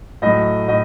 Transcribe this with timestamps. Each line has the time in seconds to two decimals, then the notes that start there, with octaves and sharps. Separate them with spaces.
0.22 A2 F#3 D#5
0.68 A2 D#5